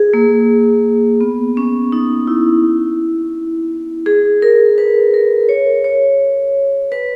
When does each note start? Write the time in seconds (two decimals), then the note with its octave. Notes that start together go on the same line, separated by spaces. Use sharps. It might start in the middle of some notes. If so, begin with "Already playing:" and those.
Already playing: G#4
0.13 A#3
1.21 B3
1.57 C#4
1.92 D#4
2.27 E4
4.06 G#4
4.42 A#4
4.78 B4
5.14 A#4
5.49 C#5
5.84 C#5
6.92 B4